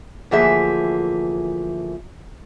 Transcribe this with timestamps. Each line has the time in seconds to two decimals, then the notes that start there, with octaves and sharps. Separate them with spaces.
0.31 D2 E3 F3 A#3 G#4 E5